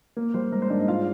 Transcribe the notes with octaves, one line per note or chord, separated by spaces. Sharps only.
A#3
G3 C5
G#2 A#4
C5
G#2 D4 D5
D#4 D#5
G#3 F4 F5